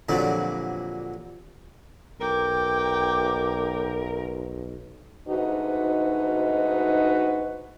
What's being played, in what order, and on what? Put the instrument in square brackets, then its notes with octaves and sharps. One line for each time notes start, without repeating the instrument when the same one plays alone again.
[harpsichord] F2 A#2 D3 F#3 G3
[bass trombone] B1 [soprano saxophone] A#4 [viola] G5 D6
[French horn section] D2 G#2 D#4 F#4 B4